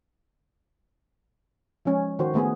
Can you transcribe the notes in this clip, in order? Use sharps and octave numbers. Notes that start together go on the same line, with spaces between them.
F3 G#3 C#4
D#3 F#4 C5
D#3 A3 B3 G#4